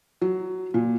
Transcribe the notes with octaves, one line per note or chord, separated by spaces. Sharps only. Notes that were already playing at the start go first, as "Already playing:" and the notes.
F#3
A#2